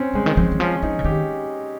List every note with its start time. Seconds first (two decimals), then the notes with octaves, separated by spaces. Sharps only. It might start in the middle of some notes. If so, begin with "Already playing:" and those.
Already playing: C4 C#4
0.13 C#3 G#3
0.26 D#3
0.37 F3 C4
0.52 D#3
0.60 F3 C#4
0.83 F3 D#4
0.99 C#3
1.04 D#3 G4